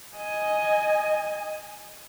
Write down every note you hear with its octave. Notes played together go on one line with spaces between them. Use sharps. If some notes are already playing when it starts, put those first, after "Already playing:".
D#5 G#5